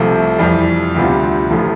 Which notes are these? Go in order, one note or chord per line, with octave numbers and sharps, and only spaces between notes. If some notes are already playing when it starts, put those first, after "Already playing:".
Already playing: C2 C3 F3 A3
F2 E3 G3
D2 C3 G3 B3 F4
A1 A2 F3 A3